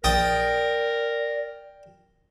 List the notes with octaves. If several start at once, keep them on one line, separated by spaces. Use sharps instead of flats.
A#1 A#4 D5 G5 D#6 A6